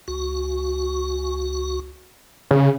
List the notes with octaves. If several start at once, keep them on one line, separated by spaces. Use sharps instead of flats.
C#2 F#4
C#3